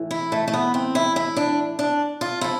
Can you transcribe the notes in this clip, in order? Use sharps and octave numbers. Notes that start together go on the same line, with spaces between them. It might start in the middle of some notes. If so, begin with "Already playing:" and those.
Already playing: A2 E3
E4
A3
A3
B3
C4
E4
E4
D4
D4
F4
F3 E4